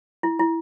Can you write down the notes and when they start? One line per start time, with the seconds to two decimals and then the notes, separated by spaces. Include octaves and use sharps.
0.23 E4
0.39 E4